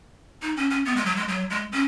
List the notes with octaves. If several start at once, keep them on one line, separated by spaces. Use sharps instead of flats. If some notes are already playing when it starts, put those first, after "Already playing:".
D#4
C#4
C#4
B3
G#3
F#3
G#3
F#3
G#3
C#4